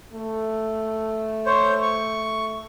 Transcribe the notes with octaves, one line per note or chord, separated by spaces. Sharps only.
A3
C5 C#5
C#6